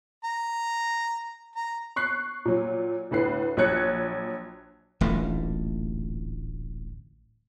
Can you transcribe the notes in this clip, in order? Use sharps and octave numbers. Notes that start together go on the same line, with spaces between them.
A#5
A#5
C#6 F#6 C7
A#2 F#3
D2 A2 B4 C7
A#1 F#3 C#5 F#6 G#6 C#7
D1 A1 G2 A#2